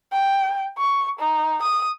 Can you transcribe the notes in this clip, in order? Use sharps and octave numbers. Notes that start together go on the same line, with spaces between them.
G5
C#6
D#4
D#6